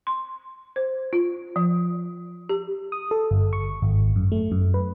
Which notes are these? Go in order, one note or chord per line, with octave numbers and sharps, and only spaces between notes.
C6
C5
F4
F3
G4
D#6
A4
G1
C#6
G#1
F#2
A3
F#2
B4